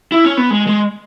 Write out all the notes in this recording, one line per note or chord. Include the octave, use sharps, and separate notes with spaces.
E4
C#4
B3
G#3
G#3